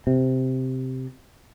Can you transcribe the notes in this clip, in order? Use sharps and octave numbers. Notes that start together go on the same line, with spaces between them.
C3